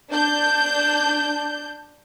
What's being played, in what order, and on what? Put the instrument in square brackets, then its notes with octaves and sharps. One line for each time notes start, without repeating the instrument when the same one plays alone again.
[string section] D4 G6